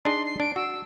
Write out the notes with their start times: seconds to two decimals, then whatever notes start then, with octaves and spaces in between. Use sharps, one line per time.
0.05 D4 D#4 G#4 C6
0.26 C7
0.40 D4 D7
0.56 F#4 E6